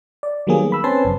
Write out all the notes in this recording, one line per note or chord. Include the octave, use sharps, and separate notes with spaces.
D5
D#3 F#3 G3 A#3 B3 G#4
B5 E6
C4 C#4 B4 G#5 A5 C6
G1 F#2 C#3